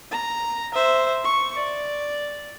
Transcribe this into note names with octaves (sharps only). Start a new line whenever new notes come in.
A#5
C5 E5
C#6
D5